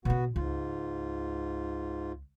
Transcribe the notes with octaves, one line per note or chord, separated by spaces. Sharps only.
B2 B3 C#4 F#4
C#2 G#2 F4